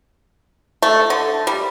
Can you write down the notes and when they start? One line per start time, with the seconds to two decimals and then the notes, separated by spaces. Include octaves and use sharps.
0.82 A3
1.10 D3
1.47 G3